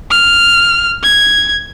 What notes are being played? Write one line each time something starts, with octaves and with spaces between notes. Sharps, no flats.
F6
G#6